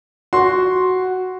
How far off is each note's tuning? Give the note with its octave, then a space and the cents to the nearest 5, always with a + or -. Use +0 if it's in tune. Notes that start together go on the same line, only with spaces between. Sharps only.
F#4 +0 C6 +0